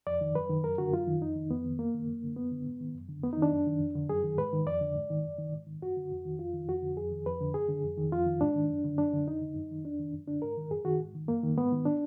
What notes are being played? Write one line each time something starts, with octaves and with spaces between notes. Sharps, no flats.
F2 D5
D#3
F#2 B4
D#3
F#2 A#4
D3 F#4
F#2 F4
D#3
F2 D#4
D#3
F2 B3
D#3
F#2 A#3
D#3
F#2
D3
F#2 B3
D3
G#2
D#3
F#2
D3
F2 B3
D#4
D#3 D4
F#2
D#3
F2
D3
F#2 G#4
D#3
G#2 B4
D#3
F2 D5
D3
G#2
D#3
F#2
D#3
G#2
D#3
F#2 F#4
D3
F2
D#3
F2 F4
D#3
F2 F#4
D3
F2 G#4
D#3
F2 B4
D3
F#2 G#4
D3
F2
D#3
F2 F4
D#3
G#2 D4
D#3
F#2
D3
F#2 D4
D3
F2 D#4
D3
F#2
D#3
F2 D4
D#3
F#2
D3 D4
G#2 A#4
D#3
F#2 G#4
D#3 F#4
G#2
D#3
F#2 A#3
D#3
G#2 B3
D#3
D4